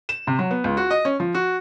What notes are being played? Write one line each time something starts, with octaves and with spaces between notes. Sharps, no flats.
E7
C3
F#3
B3
C#2
F#4
D#5
C#4
F3
F#4